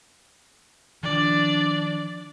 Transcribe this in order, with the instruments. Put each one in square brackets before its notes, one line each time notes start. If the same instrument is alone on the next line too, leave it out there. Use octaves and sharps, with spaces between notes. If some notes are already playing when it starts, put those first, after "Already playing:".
[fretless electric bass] D#3 F3 [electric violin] D4 D5